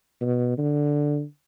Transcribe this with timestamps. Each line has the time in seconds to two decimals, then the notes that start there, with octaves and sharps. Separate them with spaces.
0.21 B2
0.58 D3